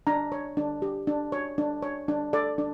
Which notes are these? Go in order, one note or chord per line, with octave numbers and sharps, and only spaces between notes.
D4 A#5
C#5
D4
G4
D4
C#5
D4
C#5
D4
A4 D5
D4